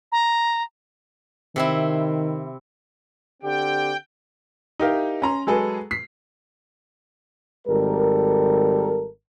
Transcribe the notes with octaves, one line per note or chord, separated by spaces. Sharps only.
A#5
C3 D#3 C4 E4
D3 C4 G4 G5
D#4 E4 G4 A#4 F5
C#4 A#5 C6
F#3 G#3 G#4 A4 B4
B6 C7
G#1 G3 A4 A#4